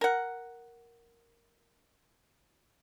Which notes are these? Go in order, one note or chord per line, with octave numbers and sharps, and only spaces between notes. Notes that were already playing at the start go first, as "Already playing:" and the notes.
A#4 F#5